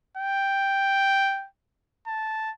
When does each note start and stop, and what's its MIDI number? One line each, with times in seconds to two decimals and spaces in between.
0.17 1.46 79
2.07 2.51 81